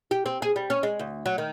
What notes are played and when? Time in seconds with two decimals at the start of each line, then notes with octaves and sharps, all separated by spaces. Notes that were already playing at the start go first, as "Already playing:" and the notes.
0.11 G4
0.26 C4
0.42 G#4
0.56 G3
0.70 C#4
0.83 G#3
0.99 D2
1.26 F#3
1.38 D#3